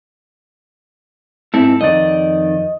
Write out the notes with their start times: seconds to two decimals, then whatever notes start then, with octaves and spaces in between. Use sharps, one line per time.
1.54 G#2 C4 E4 A4
1.81 F2 D#3 D5 D#5